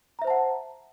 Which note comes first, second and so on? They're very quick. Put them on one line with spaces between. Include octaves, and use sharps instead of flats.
A#5 E5 C5 A5 F#5